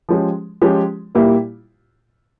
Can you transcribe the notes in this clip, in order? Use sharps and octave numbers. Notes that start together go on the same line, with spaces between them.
F3 G#3 C#4 G4
F3 G#3 C#4 G4
A#2 G3 A#3 E4 G4